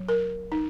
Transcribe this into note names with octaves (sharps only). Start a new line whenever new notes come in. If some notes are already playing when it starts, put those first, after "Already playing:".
Already playing: F#3
A#4
D#4